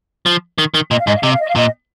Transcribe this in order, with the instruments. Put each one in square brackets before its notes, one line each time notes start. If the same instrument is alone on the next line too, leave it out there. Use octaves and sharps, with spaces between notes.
[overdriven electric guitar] F3
D#3
D#3
[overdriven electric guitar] A#2 [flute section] D#5
[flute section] F5
[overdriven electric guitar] G#2 [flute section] D#5
[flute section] F5
[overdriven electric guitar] C3 [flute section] D#5
[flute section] F5
D#5
F5
[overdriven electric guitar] A#2 [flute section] D#5